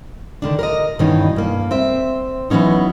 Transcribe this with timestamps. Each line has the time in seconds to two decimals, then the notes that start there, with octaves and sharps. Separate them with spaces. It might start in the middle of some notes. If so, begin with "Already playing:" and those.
0.42 D3 D#3 D4
0.59 A#4 B4 D#5
0.99 G2 B2 D#3 E3 C#4 D#4
1.36 G2 A#3
1.71 C4 E5
2.50 E3 F#3 B3 C#4 D#4